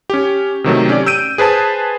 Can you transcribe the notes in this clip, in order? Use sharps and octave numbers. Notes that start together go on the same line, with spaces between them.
C#4 G4
C3 D#3 F#3 A3
C4 C#4 G4 D5
E6 G6 D7 D#7
G#4 B4 C5 A5 D#6